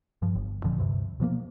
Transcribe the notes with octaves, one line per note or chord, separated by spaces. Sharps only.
G2 F3
G1
F2 A#2 D3 F3
D2 G2 C3
B2 F3 A3 A#3